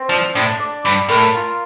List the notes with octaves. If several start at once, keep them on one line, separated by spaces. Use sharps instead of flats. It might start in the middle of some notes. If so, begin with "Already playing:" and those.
Already playing: C4
F3 D4
A2 D4
D5
G2 D5
A2 A#4
F4